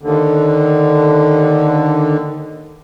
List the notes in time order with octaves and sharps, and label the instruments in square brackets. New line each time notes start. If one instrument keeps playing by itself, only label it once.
[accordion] D#2 D3